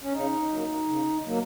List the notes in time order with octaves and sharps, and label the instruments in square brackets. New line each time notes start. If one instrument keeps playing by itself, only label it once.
[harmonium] C#4
C#3 D#4
F#3 A#3
C#3
F#3 A#3